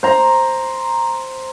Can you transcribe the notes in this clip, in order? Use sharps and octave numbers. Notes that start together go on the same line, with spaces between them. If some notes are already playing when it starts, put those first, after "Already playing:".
C5 A#5